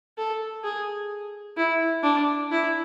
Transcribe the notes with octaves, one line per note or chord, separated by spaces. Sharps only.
A4
G#4
E4
D4
E4